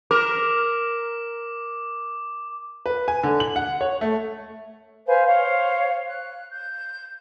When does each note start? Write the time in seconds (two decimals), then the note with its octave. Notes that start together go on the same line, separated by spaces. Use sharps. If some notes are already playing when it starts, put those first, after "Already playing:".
0.11 A#4 D6
2.86 B4
3.08 G#5
3.23 D3
3.40 F#7
3.56 F#5
3.81 C#5
4.01 A3
5.07 B4 C5 F5 G#5
5.26 C5 C#5 F5
6.06 F#6
6.51 G6